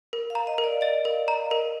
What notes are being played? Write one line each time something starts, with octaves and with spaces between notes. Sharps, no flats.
A#4
F5
A#5
D#5
A#4
D5
D5 D#5
A#4 D5
D#5 A#5
A#4 D#5